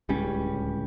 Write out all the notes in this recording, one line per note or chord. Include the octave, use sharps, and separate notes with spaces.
D1 C#2 G3 C#4